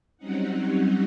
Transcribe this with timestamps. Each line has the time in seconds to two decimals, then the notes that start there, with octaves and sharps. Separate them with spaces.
0.17 F#3 G3 C4 C#4 D#4 F#5